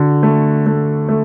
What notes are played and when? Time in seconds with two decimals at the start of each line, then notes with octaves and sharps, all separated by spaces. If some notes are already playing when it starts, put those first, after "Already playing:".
Already playing: D3 F#4
0.23 A3
0.66 A3
1.08 A3